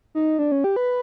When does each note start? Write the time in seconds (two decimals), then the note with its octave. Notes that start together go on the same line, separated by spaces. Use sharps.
0.15 D#4
0.39 D4
0.52 C#4
0.64 G4
0.76 B4